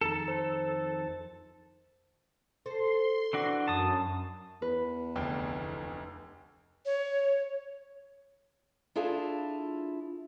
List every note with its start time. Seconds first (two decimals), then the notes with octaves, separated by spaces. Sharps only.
0.01 F2 D#3 A4 A5 A#5 A6
0.28 C5
2.66 A4 C5 C6
3.33 E3 D4 F#4
3.68 F#2 F#3 A5 D#6
4.62 E2 B4
5.16 F1 D2 G5
6.86 C#5
8.96 D4 E4 F4 G#4 A4